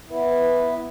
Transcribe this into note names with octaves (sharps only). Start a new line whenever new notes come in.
B3 E4 B4
B4